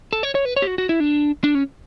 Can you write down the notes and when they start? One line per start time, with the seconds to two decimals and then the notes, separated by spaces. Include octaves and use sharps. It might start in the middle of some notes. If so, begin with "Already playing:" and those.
0.13 A4
0.23 C#5
0.35 C#5
0.45 B4
0.56 C#5
0.62 G4
0.67 F#4
0.78 F#4
0.89 E4
1.00 D4
1.44 D4
1.55 C#4